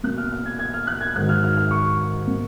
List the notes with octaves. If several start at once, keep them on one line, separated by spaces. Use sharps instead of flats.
B2 A#3 F#6
F6
F6
G#6
G#6
F6
F#6
G#6
G#2 D#3 F#3 F#6
F6
F6
F6
C#6
B2 A#3